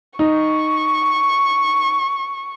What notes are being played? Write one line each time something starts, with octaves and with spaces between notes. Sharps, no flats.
D#4 C#6